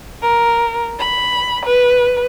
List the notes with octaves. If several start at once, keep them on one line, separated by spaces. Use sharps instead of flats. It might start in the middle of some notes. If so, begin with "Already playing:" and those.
A#4
B5
B4